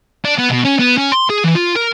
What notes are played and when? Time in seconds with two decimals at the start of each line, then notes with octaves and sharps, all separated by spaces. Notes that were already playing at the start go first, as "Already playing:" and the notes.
0.25 D4
0.38 B3
0.50 B2
0.65 C#4
0.79 B3
0.98 C#4
1.12 C6
1.30 G#4
1.44 E3
1.56 F4
1.76 A#4